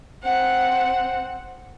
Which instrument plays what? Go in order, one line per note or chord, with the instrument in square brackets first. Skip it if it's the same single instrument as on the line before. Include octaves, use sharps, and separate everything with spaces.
[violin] C4 F#5